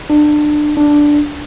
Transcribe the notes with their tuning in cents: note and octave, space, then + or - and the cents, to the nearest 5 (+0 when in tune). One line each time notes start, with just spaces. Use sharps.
D4 +25
D4 +0